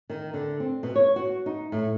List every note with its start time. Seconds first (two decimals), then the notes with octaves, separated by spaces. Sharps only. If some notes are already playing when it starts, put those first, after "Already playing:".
0.10 D#3
0.34 D3
0.60 C4
0.83 B2
0.96 C#5
1.16 F#4
1.46 D#4
1.72 A2